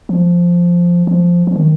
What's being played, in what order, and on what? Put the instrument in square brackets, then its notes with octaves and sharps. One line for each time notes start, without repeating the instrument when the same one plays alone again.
[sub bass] F3
F3
F3
D#3